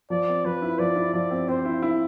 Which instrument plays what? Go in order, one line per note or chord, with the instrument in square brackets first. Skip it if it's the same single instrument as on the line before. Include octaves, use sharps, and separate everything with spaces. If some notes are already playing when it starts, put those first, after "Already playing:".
[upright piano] F3 [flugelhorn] D5
[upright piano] C4
[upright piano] F3 [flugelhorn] B4
[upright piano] E4
[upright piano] F3 [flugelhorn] D5
[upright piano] E4
[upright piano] F3 [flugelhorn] D5
[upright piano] C4
[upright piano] C4 [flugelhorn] C5
[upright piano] E4
E4